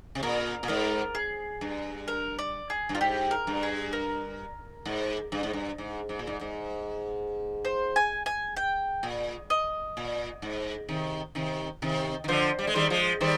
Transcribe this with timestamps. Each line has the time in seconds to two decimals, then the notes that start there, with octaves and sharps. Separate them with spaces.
0.15 C3
0.23 A#2 A#4
0.63 A#2
0.68 G#2 A#4
1.15 G#4
1.61 G2
2.08 A#4
2.39 D5
2.70 G#4
2.89 G2
2.95 F4
3.01 G#2 G4
3.31 A#4
3.47 G2
3.63 G#4
3.93 A#4
4.85 G#2
5.32 G2
5.43 G#2
5.53 G2
5.78 G#2
6.09 G#2
6.19 A#2
6.27 G#2
6.41 G#2
7.65 C5
7.96 G#5
8.26 G#5
8.57 G5
9.03 A#2
9.50 D#5
9.97 A#2
10.42 G#2
10.89 C3 D#3
11.35 C3 D#3
11.82 C3 D#3
12.24 D#3
12.28 D3 F3 C5
12.59 G3
12.67 G#3
12.74 D#3 G3 C5
12.90 F3 G#3
13.21 D#3 G3 C5